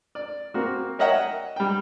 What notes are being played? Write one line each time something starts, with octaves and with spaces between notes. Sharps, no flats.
D5
A#3 C4 F#4
A#4 C#5 D#5 E5 F#5 G5
F#5
G3 G5